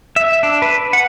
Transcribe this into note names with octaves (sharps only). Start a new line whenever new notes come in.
E5
D4
B4
F#5